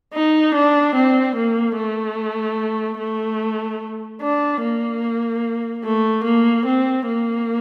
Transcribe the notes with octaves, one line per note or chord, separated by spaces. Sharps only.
D#4
D4
C4
A#3
A3
A3
D4
A#3
A3
A#3
C4
A#3